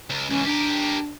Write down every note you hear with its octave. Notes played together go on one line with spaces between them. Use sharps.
C#2
C#2 E3 C#4
D4 G4 A#4